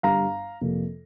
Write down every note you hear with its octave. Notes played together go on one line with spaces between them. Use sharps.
G1 G2 G3 F5 A#5
F2 C3 A#3